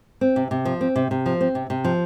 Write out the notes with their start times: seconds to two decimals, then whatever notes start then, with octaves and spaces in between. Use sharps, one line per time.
0.21 C4
0.36 C3
0.51 C3
0.65 F3
0.81 C4
0.96 C3
1.11 C3
1.26 F3
1.41 C4
1.55 C3
1.70 C3
1.85 F3